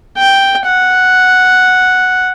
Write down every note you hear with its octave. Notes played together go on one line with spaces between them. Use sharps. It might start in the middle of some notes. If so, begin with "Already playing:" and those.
G5
F#5